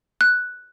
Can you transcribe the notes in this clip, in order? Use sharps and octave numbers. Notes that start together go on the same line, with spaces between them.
F#6